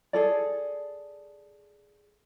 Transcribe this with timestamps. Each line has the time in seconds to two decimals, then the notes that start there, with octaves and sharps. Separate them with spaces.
0.13 G#4 A4 D5